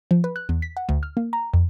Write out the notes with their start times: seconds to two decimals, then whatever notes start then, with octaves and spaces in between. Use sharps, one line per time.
0.11 F3
0.24 B4
0.36 F#6
0.49 E2
0.62 B6
0.77 F#5
0.89 D2
1.03 F6
1.17 A#3
1.33 A#5
1.54 F2